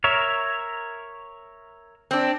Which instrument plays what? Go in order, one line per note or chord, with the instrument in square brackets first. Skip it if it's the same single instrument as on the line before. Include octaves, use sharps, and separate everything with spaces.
[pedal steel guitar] A#4 C#5 E5
[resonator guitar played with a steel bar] C4 D4